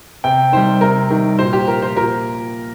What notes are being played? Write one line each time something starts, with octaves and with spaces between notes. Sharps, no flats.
C3 G5
D#3 G3 C5
C3 A#4
D#3 G3
A#2 C5
G4
F3 A#4
C5
A#2 A#4